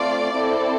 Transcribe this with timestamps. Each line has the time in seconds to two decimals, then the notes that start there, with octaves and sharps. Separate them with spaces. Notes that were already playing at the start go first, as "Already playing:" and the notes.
Already playing: A3 C4 F4 D5
0.35 C4 E4 A4